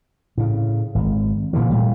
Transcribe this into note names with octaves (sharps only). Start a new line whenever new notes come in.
A2 C#3
G#1
A#2 D3 E3 F3
A#2 G3 A3